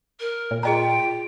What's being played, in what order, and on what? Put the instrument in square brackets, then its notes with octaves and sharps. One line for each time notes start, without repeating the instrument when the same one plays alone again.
[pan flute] A#4
[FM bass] A#2
[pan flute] F4 [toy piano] G#4 D#5 A#5 [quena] G5